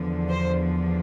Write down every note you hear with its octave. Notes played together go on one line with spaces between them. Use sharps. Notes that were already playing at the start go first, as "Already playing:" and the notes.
Already playing: E2 D3 F3
C5